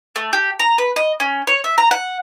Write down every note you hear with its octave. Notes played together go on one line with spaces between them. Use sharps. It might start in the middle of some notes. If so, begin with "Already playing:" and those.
A3
G4
A#5
B4
D#5
C#4
C#5
E5
A#5
F#5